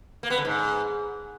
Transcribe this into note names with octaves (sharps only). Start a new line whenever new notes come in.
A#3
B3
D3
G#2